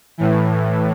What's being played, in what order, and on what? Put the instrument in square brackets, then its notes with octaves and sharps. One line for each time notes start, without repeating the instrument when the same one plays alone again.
[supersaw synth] A2 E3